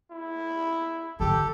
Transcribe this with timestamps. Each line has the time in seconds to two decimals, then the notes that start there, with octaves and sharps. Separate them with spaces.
0.11 E4
1.20 D3 D#3 G4 A4